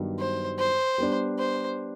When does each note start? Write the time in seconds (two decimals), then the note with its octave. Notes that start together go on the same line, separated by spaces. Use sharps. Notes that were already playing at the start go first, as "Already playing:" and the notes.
Already playing: G2 D#3 F#3 B3 D4
0.18 C5
0.58 C5
0.98 G3 B3 D4
1.38 C5